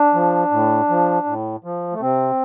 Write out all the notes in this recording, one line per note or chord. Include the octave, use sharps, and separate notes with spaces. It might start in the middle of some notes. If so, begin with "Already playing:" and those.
Already playing: D4
F3
A2
F3
A2
F3
A3
C3 C4